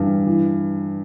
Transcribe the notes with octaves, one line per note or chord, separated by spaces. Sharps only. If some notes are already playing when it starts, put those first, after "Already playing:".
Already playing: G2 E3
E3